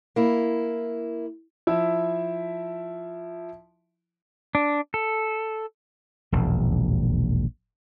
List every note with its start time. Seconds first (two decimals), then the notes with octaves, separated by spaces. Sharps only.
0.16 A#3 E4
1.67 F3 E4 E5
4.55 D4
4.94 A4
6.32 E1 A#1 D#2